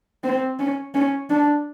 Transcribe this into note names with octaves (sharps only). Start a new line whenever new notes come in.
C4
C#4
C#4
D4